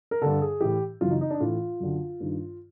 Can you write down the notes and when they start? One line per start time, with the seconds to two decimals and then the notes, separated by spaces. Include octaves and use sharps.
0.11 A#4
0.22 G2 D3 A4
0.41 G#4
0.60 A2 E3 G4
1.01 F#2 C#3 E3 F4
1.11 D#4
1.21 D#4
1.30 D4
1.40 A2 E3 F4
1.80 F#2 D3
2.20 G2 D#3